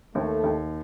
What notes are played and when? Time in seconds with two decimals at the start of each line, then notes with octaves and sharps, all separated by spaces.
0.15 D#2 A3
0.43 D#2